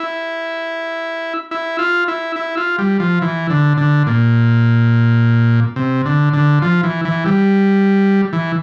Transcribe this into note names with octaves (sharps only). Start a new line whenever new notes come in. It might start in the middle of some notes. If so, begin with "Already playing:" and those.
Already playing: E4
E4
F4
E4
E4
F4
G3
F3
E3
D3
D3
A#2
C3
D3
D3
F3
E3
E3
G3
E3